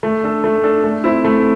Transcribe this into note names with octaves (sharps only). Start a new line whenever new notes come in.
A3
D4 A4
A3
D4 A4
A3
C4 E4
A3